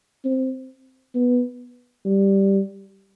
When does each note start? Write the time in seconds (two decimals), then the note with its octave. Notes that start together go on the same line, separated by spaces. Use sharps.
0.25 C4
1.15 B3
2.05 G3